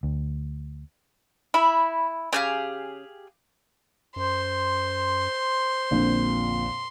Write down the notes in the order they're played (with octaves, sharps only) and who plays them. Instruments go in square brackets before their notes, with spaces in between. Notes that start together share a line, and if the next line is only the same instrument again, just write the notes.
[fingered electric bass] D2
[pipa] E4 [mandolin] B5
[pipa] C#3 [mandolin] G4 G#4 F5
[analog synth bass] F#2 [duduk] C5 [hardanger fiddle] C6
[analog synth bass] A#1 [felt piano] F2 A#2 D3